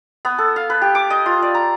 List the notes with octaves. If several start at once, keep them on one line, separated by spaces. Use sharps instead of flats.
B3
A4
F5
B4
G4
D6
D#5
F4
D5
A#5